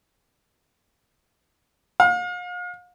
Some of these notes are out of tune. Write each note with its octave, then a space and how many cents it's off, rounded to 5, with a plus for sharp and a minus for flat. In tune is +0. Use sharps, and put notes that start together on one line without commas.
F5 +40